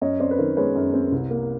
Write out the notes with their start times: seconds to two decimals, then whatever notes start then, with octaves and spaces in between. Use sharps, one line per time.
0.01 F#2 C#5 D#5
0.20 C4 C5 D5
0.31 B4
0.38 D#3 A#4 C5
0.57 G#3 B4 C#5
0.75 F#2
0.94 C4
1.12 C2
1.30 A#3